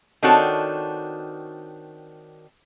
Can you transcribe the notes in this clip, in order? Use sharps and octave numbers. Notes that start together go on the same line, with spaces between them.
D#3 C4 D4 F#4 A4 C#5